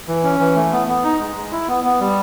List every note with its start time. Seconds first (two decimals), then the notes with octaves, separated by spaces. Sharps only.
0.08 E3
0.24 C#4
0.40 E3
0.56 A3
0.72 B3
0.88 B3
1.04 D#4
1.20 G#3
1.36 G#3
1.52 E4
1.68 B3
1.84 B3
2.00 G3